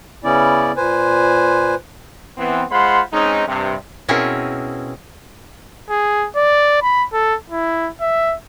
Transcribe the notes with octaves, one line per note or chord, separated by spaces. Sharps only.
C#3 B3 C#4 E4 D5
A#2 B4 C5 G#5
E3 B3 C4
G#3 F4 C5 F#5 B5 C6
G#3 C4 C#4 D#4
G2 C3
B2 C4 C#4 E4 G#4 A#4
G#4
D5
B5
A4
E4
E5